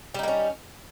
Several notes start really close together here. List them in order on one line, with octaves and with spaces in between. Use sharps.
G3 D#4 A#3 C#4